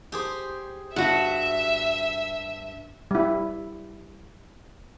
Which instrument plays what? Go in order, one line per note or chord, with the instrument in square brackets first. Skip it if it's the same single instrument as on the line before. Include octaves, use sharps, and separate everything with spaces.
[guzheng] G4 G#4 C5
[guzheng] G2 [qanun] F#4 F#5 [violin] E5
[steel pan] G3 E4